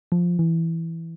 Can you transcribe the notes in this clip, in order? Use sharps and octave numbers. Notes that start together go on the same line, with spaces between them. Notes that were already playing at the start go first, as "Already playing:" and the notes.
F3
E3